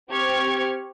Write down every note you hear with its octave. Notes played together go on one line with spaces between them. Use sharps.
C4 G4 C#6 F6 G#6